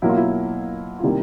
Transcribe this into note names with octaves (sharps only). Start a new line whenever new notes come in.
B2 F#3 A#3 E4
F4
E4
F4
C3 D#3 G3 A#3 E4